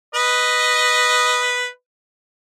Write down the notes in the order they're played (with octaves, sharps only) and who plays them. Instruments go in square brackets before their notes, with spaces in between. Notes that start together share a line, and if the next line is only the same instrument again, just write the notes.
[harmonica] B4 D#5